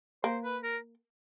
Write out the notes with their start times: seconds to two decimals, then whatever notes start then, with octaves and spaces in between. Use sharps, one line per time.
0.24 A#3 C5
0.44 B4
0.64 A#4